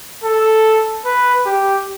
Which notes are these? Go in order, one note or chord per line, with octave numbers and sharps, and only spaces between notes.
A4
B4
G4